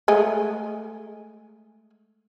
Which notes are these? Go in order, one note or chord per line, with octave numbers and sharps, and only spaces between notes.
G#3 A3 G#4